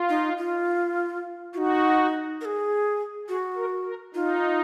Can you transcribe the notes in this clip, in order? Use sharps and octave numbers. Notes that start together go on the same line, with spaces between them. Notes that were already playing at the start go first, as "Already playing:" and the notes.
Already playing: F4
D#4
F4
D#4 F4 F#4
A#4
G#4
F#4 G#4
A#4
A#4
D#4 F4